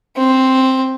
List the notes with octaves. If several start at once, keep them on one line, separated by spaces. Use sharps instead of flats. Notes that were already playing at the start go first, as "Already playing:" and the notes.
C4